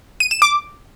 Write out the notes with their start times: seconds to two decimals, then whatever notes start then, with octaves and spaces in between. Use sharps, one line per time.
0.20 D#7
0.31 E7
0.42 D6